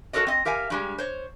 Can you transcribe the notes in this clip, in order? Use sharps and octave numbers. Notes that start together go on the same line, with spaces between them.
F#4 A4 A#4 C#5 D#5
C4 D#5
G4 A#4 E5 F5 G#5
G2 G3 G#3
C5 C#5